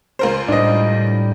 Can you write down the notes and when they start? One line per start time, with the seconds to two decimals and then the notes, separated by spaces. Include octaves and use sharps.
0.19 C#2 A#4 C5
0.48 A2 G3 D4 D#5